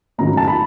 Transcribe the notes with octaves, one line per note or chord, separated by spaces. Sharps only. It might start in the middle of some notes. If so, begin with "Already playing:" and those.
G#2 D#3 F#3 A3 C#4 A#5
A5
B5